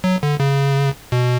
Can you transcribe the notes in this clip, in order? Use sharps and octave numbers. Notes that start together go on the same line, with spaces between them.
F#3
D3
C#3
B2